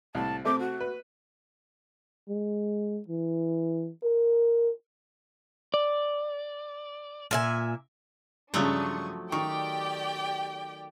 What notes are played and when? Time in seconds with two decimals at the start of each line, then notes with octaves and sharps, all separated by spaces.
0.15 C2 A2 A5
0.45 C3 A3 C4 D6
0.59 F#4
0.80 B4
2.29 G#3
3.08 E3
4.03 A#4
5.74 D5
7.31 A#2 E5 G#5
8.54 G2 C#3 F3 F#3 A3 D4 C#6 D#6
9.32 D#3 G4 D5 G5 C#6